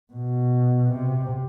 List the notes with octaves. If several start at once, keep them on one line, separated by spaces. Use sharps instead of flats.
B2
C3